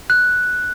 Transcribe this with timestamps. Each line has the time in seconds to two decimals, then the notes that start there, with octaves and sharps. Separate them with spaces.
0.10 F#6